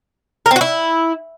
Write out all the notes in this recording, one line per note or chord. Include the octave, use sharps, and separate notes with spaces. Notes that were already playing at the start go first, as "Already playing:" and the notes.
A#4
C4
F#4
E4